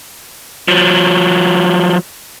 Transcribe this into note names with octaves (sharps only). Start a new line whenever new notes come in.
F3 F#3